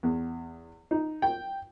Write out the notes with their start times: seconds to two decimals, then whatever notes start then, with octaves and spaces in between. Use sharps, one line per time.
0.03 E2
0.91 D#4
1.22 G5